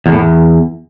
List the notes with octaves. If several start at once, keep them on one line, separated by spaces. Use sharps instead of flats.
E2
A2
E2